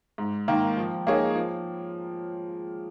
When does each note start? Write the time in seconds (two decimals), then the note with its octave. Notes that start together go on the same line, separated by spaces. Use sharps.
0.18 G#2
0.48 D#3 A#3
0.77 F3
1.07 A#3 D#4 G#4 C#5
1.35 F3